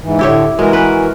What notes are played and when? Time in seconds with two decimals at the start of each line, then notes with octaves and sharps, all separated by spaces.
0.01 G#2 E3
0.19 A2 D3 E4 G4 C#5
0.59 E3 G#3 F#4 A#4
0.73 B4